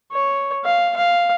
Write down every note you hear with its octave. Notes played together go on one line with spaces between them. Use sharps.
C#5
F5
F5